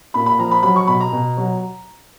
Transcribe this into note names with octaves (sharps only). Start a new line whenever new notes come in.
A#2 B5
B5
F3 A#5
B5
F#3 B5
C#6
B2 B5
A#5
B2
F#3